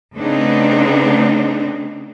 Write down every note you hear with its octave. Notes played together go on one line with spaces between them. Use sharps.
C#3 A3 B3 C4 D4 D#4